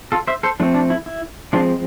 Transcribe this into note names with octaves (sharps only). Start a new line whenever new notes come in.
F4 A4
C5 E5
A4 C5
F3 A3 C4 D4
D4
E4
E4
F3 G#3 C4 D4 F4